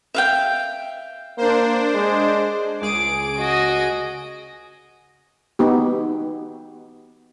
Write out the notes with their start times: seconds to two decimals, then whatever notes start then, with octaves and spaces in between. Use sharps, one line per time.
0.14 E5 F5 G5
1.38 A#3 D4 C5
1.94 G#3
2.82 C#2 G#4 D6 D7
3.38 F#4 D#5
5.59 B3 D#4 G4